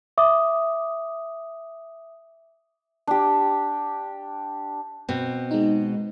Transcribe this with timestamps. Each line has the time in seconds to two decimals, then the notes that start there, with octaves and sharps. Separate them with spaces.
0.18 E5 D6 D#6
3.07 D4 G4
5.08 B2 C4
5.51 G#3 D#4